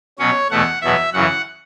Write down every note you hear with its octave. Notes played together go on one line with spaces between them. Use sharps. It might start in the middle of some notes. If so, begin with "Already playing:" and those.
B2 F#3 C#4 C#5
E2 B2 A3 F#5
E2 B2 F#3 B3 E5
F#2 C#3 E3 F#5